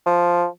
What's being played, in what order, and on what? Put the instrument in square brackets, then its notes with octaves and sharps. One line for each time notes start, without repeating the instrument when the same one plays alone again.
[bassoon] F3